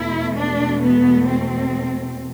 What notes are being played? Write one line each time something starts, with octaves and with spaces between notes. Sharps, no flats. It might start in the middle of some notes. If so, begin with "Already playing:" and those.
Already playing: E2 B2 A3 E4
D4
B3
C4